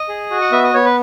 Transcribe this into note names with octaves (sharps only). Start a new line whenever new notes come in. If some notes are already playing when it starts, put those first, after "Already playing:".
Already playing: D#5
G#4
F#4
F#5
B3 E5
D#5
B3 C#5
B4